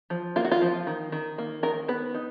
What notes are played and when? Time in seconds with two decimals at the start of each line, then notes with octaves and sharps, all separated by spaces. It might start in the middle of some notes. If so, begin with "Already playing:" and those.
0.10 F3
0.36 A#3 F4
0.45 F#4
0.51 F4
0.62 F3
0.87 D#3
1.12 D#3
1.38 A#3
1.63 D#3 A#4
1.88 B3 B4
2.14 D#4